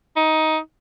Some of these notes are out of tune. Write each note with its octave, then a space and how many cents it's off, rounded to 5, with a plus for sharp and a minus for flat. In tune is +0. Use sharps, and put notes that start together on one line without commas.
D#4 +15